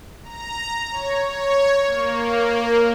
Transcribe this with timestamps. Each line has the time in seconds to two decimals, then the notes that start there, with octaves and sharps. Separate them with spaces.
0.24 A#5
0.91 C#5
1.27 C#5
1.86 A#3